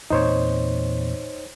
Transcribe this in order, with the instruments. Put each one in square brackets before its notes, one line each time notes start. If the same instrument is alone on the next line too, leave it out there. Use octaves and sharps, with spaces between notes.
[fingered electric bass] E2 A#2 C4 [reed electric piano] D#4 C5 C#5